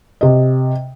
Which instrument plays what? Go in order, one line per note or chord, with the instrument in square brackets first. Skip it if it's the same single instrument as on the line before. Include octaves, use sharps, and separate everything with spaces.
[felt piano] C3 D#5